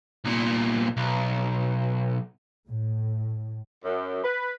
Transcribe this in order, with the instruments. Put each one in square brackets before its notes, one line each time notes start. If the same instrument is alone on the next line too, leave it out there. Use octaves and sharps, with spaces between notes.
[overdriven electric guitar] C2 A#2
B1
[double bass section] A2
[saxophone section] F#2
B4